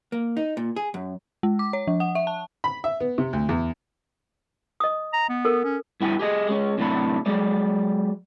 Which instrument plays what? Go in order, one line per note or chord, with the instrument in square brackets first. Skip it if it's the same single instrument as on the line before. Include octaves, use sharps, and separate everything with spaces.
[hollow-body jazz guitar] A#3
D#4
A#2
G#4
F#2
[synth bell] G#3
D6
C#5
F3
F#5
E5
A5
[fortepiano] B5
E5
B3
C3
D2
E2
[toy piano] D#5 D#6
[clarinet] A#5
B3
[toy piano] A4 A#4
[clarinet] C#4
[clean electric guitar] G2 E4 G5 G#5
G4 G#4 D#5
G#3 C#4
F#2 A2 C3 D4 B5
F#3 G#3 D5